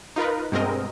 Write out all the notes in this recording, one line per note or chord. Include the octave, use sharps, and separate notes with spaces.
D#4 F4 A#4 B4
G2 B2 G#3 C4 A#4 D#5